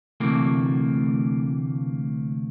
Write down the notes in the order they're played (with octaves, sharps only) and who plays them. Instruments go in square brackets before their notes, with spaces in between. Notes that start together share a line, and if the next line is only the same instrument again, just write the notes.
[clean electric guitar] D2 C3 E3 A3 A#3